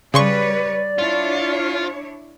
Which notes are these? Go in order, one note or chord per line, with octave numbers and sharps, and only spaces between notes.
C#3 G3 B4 C#5 D5 C6 C#6
D4 E4 F4 C#5